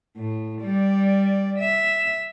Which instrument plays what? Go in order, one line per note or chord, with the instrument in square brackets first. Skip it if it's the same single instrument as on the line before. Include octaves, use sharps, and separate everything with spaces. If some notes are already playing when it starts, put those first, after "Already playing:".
[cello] A2
G3 D5
E5